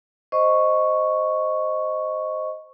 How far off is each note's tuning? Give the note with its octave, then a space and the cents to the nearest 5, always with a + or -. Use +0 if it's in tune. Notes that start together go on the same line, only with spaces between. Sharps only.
C5 +0 D#5 +0 C#6 +0